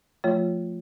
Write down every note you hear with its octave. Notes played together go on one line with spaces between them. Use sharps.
F3 A3 F4 C#5